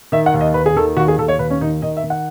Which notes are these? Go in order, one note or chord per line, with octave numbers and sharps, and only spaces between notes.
D#3 E5
F#5
D#2
D#5
D#2 B4
G#4
D#3 A4
D#2 F#4
G#4
D#2 A4
C#5
D#2 B4
C#4
D#3 D#4
D#3 D#5
E5
D#3
F#5